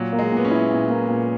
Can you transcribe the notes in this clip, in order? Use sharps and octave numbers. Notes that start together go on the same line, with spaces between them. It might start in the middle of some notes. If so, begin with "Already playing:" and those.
Already playing: A#2 F#3
A#3
G#3
A#2 B3
C#4
E4
A#2
A#3
A#2